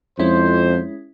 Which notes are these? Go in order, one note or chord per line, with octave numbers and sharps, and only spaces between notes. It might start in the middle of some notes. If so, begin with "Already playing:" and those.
F2 G#3 C#4 E4 C5